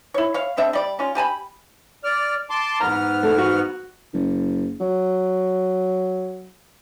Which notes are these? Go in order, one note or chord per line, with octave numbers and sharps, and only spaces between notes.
E4 C#5
C#5 F5
C#3 C4 D4 E5
G3 D5
C#4 F4
G4 G#5 A5 B5
D5 F6
A5 C6 D6
G#2 B3 A#5 F6
A3
F#4
F#1
F#3